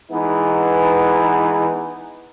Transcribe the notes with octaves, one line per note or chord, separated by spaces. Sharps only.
E3 G#3 B3 D#4